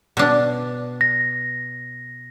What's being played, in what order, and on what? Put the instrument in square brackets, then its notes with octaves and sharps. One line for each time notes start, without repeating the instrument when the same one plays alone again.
[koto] B2 D4
[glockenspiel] A#6